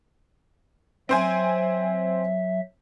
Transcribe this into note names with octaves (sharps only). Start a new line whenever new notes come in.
F#3 C4 C5 E5 G#5